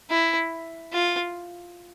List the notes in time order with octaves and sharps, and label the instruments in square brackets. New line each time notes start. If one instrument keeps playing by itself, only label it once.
[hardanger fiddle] E4
F4